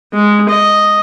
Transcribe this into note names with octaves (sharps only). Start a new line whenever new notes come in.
G#3
D#5